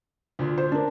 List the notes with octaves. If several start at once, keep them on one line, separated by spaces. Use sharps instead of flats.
D2 A#2
C5
D4 A#4